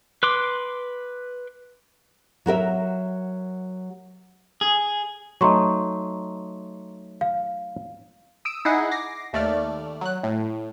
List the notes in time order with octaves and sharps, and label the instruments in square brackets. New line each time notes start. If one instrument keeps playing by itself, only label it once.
[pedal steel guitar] B4 C6 D6
[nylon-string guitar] F#3 F#4 A#4 E5
[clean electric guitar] G#4
[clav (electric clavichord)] F#3 A3 D#4 [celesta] A#5 C6 C#6
[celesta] F5
[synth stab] D#6 E6 D7
D#4 E4 G#4 D#5 F#5
D6 A#6 C7
D#2 A3 D5 F6
F#3 F#6
A2